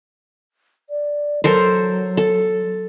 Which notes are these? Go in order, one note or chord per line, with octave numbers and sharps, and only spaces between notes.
D5
F#3 A4 A#4 C5
A4